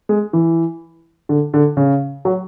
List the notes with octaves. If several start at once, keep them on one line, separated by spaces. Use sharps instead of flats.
G#3
E3
D3
D3
C#3
F#3